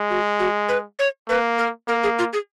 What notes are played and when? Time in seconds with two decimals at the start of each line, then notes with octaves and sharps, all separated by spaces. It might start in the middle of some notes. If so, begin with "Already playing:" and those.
Already playing: G#3
0.10 F#4
0.39 F#4
0.69 B4
0.99 C#5
1.29 A#3 B4
1.58 A#4
1.88 A#3 A#4
2.03 G#4
2.19 F4
2.33 G#4